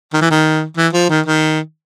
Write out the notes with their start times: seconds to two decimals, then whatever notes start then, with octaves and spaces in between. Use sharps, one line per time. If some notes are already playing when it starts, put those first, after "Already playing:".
0.13 D#3
0.21 E3
0.31 D#3
0.77 E3
0.93 F3
1.09 D#3
1.26 D#3